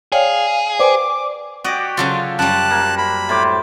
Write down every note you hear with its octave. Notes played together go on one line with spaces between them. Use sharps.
G#4 C#5 D5 F5 G5
B4 C5 D5 G5 G#5 D6
F#4 G4 D5 D#5
C#3 F#3 F4 G4 A4 C5
F#2 G3 A5 F#6
A#3
B5
A2 C5 D6